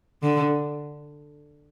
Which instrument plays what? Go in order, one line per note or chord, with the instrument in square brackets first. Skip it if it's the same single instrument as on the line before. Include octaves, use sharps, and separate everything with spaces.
[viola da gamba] D3